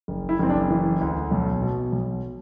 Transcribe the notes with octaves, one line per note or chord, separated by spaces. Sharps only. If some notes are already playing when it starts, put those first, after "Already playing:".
F#1
E4
F#1 C4
D4
E3
D2
B1
B2
B1